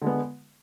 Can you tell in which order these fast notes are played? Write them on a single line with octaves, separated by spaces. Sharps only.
D3 G#3 B3